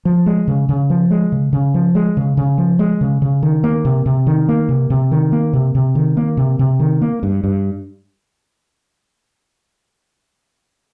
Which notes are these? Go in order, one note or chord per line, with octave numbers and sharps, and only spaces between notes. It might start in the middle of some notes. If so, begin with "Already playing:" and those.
F3
G#3
C#3
C#3
F3
G#3
C#3
C#3
F3
G#3
C#3
C#3
F3
G#3
C#3
C#3
D#3
A#3
C3
C3
D#3
A#3
C3
C3
D#3
A#3
C3
C3
D#3
A#3
C3
C3
D#3
A#3
G2
G2